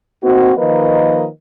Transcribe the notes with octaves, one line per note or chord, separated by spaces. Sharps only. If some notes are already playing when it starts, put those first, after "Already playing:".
A#3 C4 D#4 F#4
D#3 F3 A#3 A#4 B4 D#5